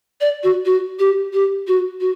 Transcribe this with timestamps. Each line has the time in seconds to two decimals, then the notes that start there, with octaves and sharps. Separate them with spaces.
0.21 D5
0.43 F#4
0.65 F#4
0.99 G4
1.33 G4
1.67 F#4
2.00 F#4